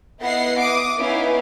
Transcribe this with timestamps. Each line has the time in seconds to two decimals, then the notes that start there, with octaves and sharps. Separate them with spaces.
0.20 B3 E4 D#5 F#5 A#6 C7
0.60 D6 D#6
0.97 B3 C#4 D#4 E4 B4 F5